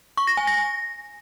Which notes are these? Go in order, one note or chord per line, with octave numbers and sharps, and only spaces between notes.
C#6
A#6
G#5
A#6